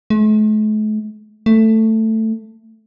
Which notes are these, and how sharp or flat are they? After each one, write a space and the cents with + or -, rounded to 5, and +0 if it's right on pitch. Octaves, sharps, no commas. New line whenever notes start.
A3 -45
A3 +10